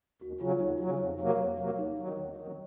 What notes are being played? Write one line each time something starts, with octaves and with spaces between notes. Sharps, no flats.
D#2 F#4
C#3 F#3 F4
D#2 D#4
C#3 F#3
F2
C3 F#3 A#3
F2
C3 F#3 A#3
D#2 D#4
D#3 F#3
D#2
D#3 F#3